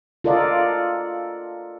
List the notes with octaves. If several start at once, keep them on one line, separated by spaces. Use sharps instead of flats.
F4 A4 A#4 D5 D#5 F#5